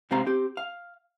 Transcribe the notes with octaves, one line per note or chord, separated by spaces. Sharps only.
G#2 C3 C4 G4 F5 A#5
C4 G4
F5